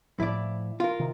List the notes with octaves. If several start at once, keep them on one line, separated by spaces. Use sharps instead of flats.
A2 F3 E4 D5
F4 A#4
C3 D#3